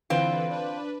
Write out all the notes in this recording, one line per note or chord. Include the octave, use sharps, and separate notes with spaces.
D3 E3 C4 F4 B4
D4 B4